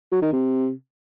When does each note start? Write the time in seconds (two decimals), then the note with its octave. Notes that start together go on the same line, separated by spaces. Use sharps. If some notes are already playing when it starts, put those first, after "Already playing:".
0.12 F#3
0.22 D#3
0.33 C3